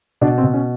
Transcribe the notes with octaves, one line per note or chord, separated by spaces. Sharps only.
B2 D4
C4
B2
C#4